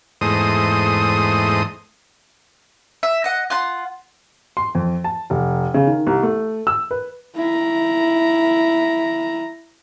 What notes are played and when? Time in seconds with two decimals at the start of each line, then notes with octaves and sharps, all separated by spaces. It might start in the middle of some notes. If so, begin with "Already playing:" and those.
0.21 E2 G#2 A3 C5 D#5 D#6
3.03 E5
3.24 D#5 F#5
3.50 F4 F#5 C6
4.57 C6
4.75 F2
5.04 A5
5.30 F1
5.74 C#3
5.87 D#3
6.07 C2
6.23 A3
6.67 E6
6.91 B4
7.36 E4 A#5